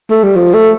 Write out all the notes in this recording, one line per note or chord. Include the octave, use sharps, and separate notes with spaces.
A3
G3
F3
A3